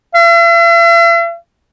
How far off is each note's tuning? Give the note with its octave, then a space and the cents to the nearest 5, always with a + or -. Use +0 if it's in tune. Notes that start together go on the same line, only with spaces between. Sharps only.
E5 +45